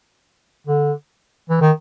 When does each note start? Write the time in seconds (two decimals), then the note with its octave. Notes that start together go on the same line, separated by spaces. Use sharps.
0.67 D3
1.50 E3
1.61 D#3